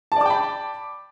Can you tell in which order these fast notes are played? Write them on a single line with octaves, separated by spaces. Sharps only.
A5 D5 D6 G5 B5